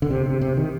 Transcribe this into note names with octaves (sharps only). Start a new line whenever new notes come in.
D3
C3
C3
C3
D#3